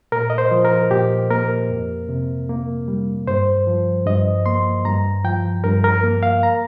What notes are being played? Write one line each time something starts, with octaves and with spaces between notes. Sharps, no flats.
A#2 A#4
D#5
C5
F3
A#4
A#2 G4
A#3 A#4
F2
C3
A#3
G3
G2 C5
F3
G2 D#5
A#3 C6
G2 A#5
F3 G5
G2 A#4
A#4
A#3
F5
A#5